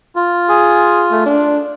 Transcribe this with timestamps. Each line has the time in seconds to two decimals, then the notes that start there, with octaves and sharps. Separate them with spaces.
0.16 F4
0.49 G#4
1.12 A3
1.26 D4